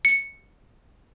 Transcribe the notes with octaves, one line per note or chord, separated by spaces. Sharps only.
C#7